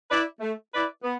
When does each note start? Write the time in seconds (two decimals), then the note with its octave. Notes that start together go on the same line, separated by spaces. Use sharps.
0.10 E4 B4 D5
0.41 A3
0.73 E4 B4 D5
1.04 B3